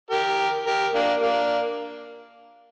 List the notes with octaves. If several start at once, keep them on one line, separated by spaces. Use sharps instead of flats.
G4 A#4
G4 A#4
A#3 D4
A#3 D4